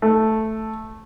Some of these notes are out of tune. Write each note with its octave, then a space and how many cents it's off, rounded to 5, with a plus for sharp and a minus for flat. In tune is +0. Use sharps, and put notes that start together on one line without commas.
A3 +0